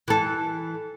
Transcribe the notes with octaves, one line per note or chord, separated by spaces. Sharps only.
E3 A4